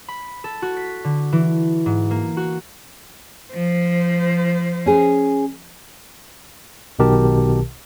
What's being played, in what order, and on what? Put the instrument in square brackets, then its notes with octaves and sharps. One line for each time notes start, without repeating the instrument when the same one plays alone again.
[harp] B5
A4
F#4
B6
D3
E3
G#2
A#3
F#4
[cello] F3 C5
[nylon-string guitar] C#4 G#4
[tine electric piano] B1 B2 D#3 G4 A#4 A5